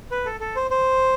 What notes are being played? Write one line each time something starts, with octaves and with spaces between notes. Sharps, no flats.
B4
A4
A4
C5
C5